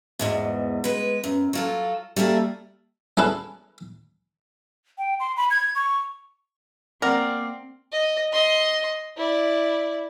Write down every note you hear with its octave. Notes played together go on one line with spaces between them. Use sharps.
E2 G#2 B2
G#3 B4
F#2
F#3 F4 A4
G3 A3 A#3 A4
C#4 E4 G#4 A4 B4
G5
C6
B5
G#6
C#6
A#3 C4 A#4 D5 F#5
D#5
D#5 C6
E4 D5